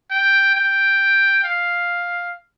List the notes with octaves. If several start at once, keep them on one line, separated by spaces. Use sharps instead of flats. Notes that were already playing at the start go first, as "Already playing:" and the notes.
G5
G5
F5